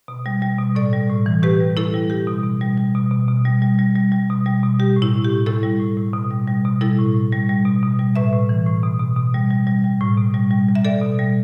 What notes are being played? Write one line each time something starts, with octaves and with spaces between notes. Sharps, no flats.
B2
G3
G3
B2
A2 A4 D5
G3
A2
E3
A2 G4 B4
G3
A2 E4 A4
G3
G3 G4
B2
B2
G3
G3
B2
B2
B2
G3
G3
G3
G3
G3
B2
G3
B2
G3 G4
A2
E4
A2
G4
A2
A2 E4 A4
G3
A2
A2
B2
G3
G3
B2
G3 E4 A4
A2
A2
G3
G3
B2
B2
G3
A2 B4 E5
A2
E3
A2
B2
B2
B2
G3
G3
G3
G3
A2
B2
G3
G3
G3
E5
G3 A4 D5
B2
G3